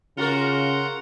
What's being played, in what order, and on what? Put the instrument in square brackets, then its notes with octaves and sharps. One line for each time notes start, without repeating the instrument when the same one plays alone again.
[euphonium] C#3 [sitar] F4 F#4 A#4 [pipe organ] F#5 A#5 C6